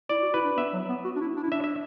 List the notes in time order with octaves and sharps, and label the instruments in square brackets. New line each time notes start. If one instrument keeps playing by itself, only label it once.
[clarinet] E4 [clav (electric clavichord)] D5
[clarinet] F#4
[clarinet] E4 [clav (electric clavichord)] B4
[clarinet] D4
[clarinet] B3 [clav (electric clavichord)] E5
[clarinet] F#3
B3
F#4
D4
E4
D4
E4
[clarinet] D4 [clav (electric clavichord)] E5
[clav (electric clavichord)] E5